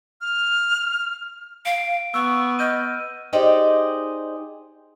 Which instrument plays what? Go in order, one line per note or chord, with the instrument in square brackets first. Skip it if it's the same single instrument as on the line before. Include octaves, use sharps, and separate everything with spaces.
[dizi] F6
[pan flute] F5 [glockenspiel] D7
[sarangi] B3 [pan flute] C#6 [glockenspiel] E6 F#6
[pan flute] D#5 [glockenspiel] F6 G6 D#7
[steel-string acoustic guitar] D#4 G4 G#4 C5 D5 D#5